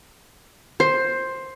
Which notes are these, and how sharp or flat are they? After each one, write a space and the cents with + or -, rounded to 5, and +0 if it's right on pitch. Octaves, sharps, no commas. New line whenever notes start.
C5 +10